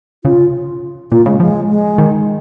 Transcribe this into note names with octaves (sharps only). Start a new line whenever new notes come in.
C#3 F4
A#2 F4
C#3 G#3
F3 G#3
G#3
D#3